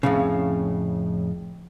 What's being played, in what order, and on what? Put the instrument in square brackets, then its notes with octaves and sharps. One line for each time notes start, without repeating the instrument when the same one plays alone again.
[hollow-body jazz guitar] F2 A2 C#3